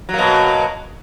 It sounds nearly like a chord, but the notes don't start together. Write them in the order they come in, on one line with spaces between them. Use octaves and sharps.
F#3 A#3 B2